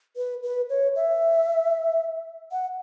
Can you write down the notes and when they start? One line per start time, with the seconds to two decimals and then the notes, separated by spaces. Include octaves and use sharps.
0.17 B4
0.43 B4
0.69 C#5
0.96 E5
2.52 F#5